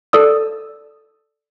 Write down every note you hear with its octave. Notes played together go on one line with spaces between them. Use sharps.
A4 D5 D#6 E6